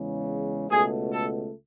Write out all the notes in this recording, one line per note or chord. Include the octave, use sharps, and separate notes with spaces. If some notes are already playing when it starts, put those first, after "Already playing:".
Already playing: E2 C#3 G#3
C#2 B2 A3 G#4
A4